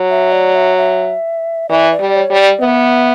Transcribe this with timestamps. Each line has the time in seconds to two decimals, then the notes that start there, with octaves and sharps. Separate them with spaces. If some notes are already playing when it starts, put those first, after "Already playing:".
Already playing: F#3
0.10 E5
0.32 D5
0.55 E5
0.78 E5
1.69 E3 D5
1.92 D5
2.00 G3
2.16 C#5
2.30 G3
2.38 D5
2.61 B3 E5